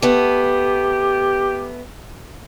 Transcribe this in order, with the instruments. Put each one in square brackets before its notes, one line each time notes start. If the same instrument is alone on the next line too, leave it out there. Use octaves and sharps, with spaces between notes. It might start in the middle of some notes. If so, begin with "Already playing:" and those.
[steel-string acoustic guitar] A3 B3 [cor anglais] G4